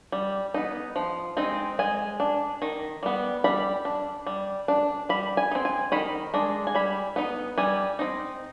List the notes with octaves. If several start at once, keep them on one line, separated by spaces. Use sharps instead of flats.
G3
B3 D#4
F3
G#3 C4 D#4
G#3 G#5
D4
D#3
G3 B3
G3 B5
D4
G3
D4
G3 B5
G#5
D#4
C4
G#5
D#3 B5
G#3 D4
G#5
G3 B5
B3 D#4
G3 G#5
C4 D#4